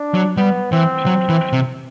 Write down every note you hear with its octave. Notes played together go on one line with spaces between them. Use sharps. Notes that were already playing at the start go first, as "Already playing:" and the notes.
Already playing: D4
F#3
G3 B3
E3 C4
F#3
E3
C3